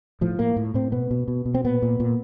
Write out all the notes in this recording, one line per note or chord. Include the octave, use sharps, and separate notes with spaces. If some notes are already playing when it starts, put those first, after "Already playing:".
A2 F3
A2 A#3
A2
A2 C4
B2 B3
B2
B2
B2
C4
A#2 B3
A#2
A#2